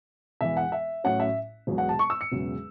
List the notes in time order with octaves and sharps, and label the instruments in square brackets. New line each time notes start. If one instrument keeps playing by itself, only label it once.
[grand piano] E1 E2 E3 E5
F#5
E5
A1 A2 F#3 C#4 F#5
E5
E1 E2 B2 F#3
F#5
A5
C#6
E6
C#7
E1 E2 C#3 F#3